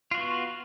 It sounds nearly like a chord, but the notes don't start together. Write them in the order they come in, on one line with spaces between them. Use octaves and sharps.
F4 F#4 B3